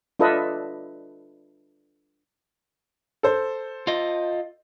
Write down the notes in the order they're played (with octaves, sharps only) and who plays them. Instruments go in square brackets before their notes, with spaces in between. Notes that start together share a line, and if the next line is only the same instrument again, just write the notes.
[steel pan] D4 F4 A4 B4 D#5 E5
[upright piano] A4 C5
[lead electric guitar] F4 D#5